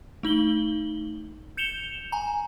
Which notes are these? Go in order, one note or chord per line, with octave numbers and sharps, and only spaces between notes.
A3 D#4 F#7 G7
G6 C#7 E7 F7 G7
G#5 A#5